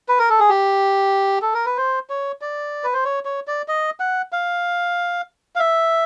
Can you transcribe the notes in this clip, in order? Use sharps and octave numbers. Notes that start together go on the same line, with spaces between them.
B4
A#4
A4
G#4
G4
A4
A#4
B4
C5
C#5
D5
B4
C5
C#5
C#5
D5
D#5
F#5
F5
F5
E5